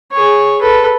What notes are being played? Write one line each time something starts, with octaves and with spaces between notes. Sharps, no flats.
G#4 C#5
A4 B4